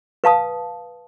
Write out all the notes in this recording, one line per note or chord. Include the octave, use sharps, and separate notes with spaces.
B4 F5 A5 D#6